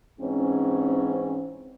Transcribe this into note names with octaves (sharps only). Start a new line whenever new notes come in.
G#2 E3 C4 C#4